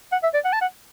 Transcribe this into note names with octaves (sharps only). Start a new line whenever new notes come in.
F#5
E5
D5
F#5
A5
F#5